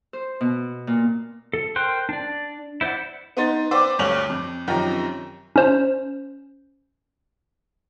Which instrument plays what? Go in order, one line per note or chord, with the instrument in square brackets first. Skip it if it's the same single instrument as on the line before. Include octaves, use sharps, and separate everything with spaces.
[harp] C5
B2
A#2
[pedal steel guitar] A4
A#4 C5 G5 C6 F#6
D4 D5
E4 C5 D5 F#5
[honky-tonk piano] B3 D#4 C6 A6
B4 C5 D5 G5 D6 E6
D2 G2 C#5 F7 F#7
F2
F#2 C3 D#3 F3 G4 A#5
[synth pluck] C#4 C5